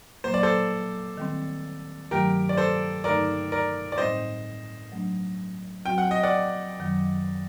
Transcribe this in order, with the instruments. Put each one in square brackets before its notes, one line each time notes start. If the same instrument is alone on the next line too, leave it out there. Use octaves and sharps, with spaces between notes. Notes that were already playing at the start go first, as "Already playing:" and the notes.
[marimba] A#2 F#3 A#3 [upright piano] C5
[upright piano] D5
A4 C5
[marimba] D#3 G3 C4
[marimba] G2 D#3 F#3 A3 [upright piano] G4 A#4
[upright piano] D5
A4 C5
[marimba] G2 D3 A3 D#4 [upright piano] A#4 D5
[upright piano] A#4 D5
D5
[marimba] A2 G3 C4 D#4 [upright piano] C5 D#5
[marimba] F#3 A3 D4
[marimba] F#3 C4 F#4 [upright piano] G5
[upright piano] F#5
D#5
D5 F#5
[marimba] F#2 D#3 F#3